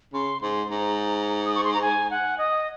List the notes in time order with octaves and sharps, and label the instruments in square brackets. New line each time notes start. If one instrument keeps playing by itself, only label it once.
[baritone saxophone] C#3 [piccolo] C6
[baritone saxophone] G#2 [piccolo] C6
[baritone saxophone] G#2 [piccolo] A#5
[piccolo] D#6
C#6
C6
A#5
G#5
F#5
D#5